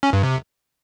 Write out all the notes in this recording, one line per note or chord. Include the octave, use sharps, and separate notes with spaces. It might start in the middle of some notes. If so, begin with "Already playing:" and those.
C#4
G2
C3